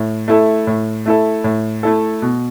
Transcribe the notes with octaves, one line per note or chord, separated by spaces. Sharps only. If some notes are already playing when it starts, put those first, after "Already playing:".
Already playing: A2
A3 E4 A4
A2
A3 E4 A4
A2
A3 E4 A4
B2